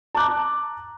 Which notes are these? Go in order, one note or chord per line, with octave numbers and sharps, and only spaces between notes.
A5 A#5 D6 F#6